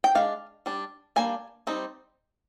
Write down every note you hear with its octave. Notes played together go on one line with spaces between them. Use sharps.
G5
G#3 D4 F5
G3 D4
G3 A#3 D4 G#5
G3 C4 D#4